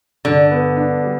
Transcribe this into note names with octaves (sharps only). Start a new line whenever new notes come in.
G2 D3
B3
D4
G3